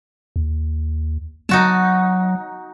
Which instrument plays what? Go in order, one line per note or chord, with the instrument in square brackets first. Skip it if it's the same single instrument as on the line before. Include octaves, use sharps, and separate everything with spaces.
[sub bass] D#2
[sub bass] F#3 [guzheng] D#4 F#4 A5